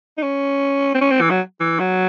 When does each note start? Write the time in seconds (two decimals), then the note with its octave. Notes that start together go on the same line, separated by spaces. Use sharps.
0.18 D#4
0.23 C#4
0.95 C4
1.01 C#4
1.11 C4
1.21 E3
1.30 F#3
1.60 E3
1.80 F#3